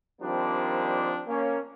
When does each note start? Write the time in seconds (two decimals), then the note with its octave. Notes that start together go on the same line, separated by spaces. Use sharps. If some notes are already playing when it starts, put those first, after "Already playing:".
0.21 D#3 F3 G3 A#3 C4 D4
1.28 A#3 C#4